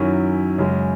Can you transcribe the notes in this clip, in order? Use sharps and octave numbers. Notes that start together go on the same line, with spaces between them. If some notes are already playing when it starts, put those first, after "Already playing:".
Already playing: F#2 D#3 F#3 C#4 E4
F#2 C#3 G#3